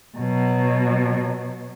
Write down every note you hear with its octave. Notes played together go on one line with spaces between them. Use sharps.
B2 F#3